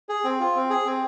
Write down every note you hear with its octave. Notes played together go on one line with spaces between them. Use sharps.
G#4
C4
F4
C4
G#4
C4